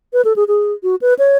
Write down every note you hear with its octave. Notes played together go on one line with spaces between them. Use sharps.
B4
A4
G#4
G#4
F#4
B4
C#5